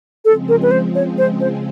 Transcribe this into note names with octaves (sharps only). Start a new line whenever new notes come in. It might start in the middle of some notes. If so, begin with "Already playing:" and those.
C#3 F3 G#3 C4 A4
A#4
B4
C5
C#5
C5
C5